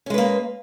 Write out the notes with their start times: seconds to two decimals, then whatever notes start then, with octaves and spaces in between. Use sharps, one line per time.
0.06 C#4
0.10 G#3
0.14 B4
0.18 A#3